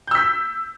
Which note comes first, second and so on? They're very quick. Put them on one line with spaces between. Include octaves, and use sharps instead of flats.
G6 E6 B6